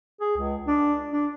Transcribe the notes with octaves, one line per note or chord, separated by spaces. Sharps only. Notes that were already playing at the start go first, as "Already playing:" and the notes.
G#4
C#2
D4
D4